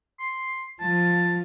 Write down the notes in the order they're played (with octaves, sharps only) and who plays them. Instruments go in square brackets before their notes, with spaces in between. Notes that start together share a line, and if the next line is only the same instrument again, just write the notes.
[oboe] C6
[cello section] F3 [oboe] A5